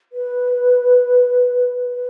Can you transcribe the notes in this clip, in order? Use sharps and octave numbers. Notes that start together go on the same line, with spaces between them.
B4
B4